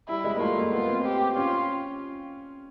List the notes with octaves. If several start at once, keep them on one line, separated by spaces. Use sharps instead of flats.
G3 E4
G#3
A#3
A3 F4
A#3
B3 F4
C4
G4
C#4 F4